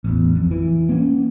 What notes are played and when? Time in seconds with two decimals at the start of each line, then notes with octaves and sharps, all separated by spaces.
0.04 A1 E2
0.35 F2
0.51 E3
0.89 A#3 C#4